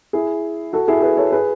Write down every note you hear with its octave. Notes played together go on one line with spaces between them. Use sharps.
E4 G#4
F#4 A4
E4 G#4
G#4 B4
A4 C#5
G#4 B4